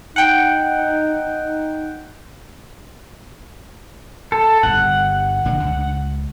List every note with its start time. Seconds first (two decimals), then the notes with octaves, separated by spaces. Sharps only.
0.16 D#4 F#5 G5
4.32 A4
4.63 G1 G2 F#5
5.45 D#1 D3 D4
5.64 C#2